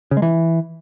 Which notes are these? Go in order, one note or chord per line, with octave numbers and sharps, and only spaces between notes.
C#3
G#3
E3